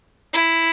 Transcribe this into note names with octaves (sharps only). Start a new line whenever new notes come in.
E4